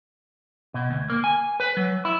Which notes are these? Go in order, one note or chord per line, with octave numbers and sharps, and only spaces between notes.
B2
D2
A#3
G#5
B4
F#3
E4